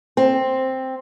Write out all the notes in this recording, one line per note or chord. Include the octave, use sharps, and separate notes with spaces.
C4